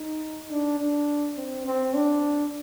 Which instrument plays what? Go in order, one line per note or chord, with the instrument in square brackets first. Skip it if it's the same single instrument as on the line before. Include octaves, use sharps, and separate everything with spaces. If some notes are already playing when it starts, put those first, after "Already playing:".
Already playing: [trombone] D#4
D4
D4
C4
C4
D4